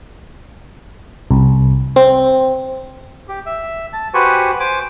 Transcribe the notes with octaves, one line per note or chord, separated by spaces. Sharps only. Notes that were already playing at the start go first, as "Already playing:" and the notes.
C2
C4
G4
E5
A5
F#4 G4 B4 C5 G#5 C#6
C5 G#5 D6